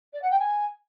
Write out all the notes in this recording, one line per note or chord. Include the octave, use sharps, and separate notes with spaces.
D5
F#5
G5
G#5